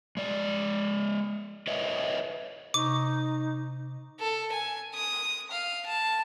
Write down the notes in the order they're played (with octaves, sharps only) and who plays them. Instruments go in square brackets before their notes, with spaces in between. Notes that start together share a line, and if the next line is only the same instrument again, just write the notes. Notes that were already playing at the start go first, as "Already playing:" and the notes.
[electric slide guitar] G#3 D5
B4 C#5 D#5 E5
[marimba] C3 C#6 [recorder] D#4 [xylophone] D6
[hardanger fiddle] A4
G#5
D#6
F5
A5